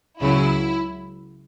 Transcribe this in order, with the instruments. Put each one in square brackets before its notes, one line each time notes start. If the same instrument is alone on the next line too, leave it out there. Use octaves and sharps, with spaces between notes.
[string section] C#2 C#3 F#3 E4